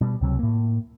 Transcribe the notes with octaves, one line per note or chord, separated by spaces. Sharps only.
B2 G3
C#2 C3 F#3
A2 A#3